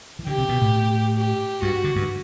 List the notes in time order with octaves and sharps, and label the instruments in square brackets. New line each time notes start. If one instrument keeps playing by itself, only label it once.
[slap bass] E3
[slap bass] D3 [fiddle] G4
[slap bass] C3
B2
A2
[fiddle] G4
[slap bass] G2 [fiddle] F#4
[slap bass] D3
G2